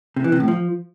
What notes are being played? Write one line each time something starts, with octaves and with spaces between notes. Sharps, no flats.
C3
E3
C3
A2
F3